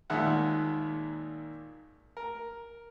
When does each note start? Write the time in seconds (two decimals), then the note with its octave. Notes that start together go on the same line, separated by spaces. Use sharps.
0.10 D#2 A#2 D#3 G#3 E5 F#5
2.17 A#4